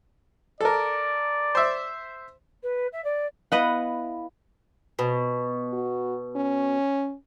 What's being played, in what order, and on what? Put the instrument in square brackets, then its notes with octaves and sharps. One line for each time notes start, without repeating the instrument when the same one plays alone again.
[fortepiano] A4 A#4 [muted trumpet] D5
[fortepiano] C5 E5
[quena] B4
E5
D5
[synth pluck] B3 E4 [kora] B4 D#5 F#5 [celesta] F5 B5
[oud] B2
[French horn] F#4
C#4